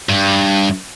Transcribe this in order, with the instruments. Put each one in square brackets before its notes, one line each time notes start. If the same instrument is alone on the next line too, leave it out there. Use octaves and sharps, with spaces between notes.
[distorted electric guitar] G2